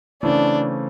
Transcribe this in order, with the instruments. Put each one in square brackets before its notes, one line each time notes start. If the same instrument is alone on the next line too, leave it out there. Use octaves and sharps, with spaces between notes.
[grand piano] C#3 E3 A3 C4 [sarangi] D4